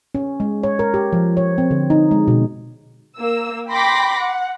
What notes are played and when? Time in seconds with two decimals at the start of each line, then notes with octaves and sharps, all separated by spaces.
0.15 C#4
0.40 G#3
0.63 C#5
0.79 A#4
0.94 G4
1.13 F3
1.37 C#5
1.58 C4
1.71 D3
1.90 D#4
2.11 G#3
2.28 B2
3.18 A#3 E6
3.69 G5 B5 C6 D6 A#6 B6
4.19 F#5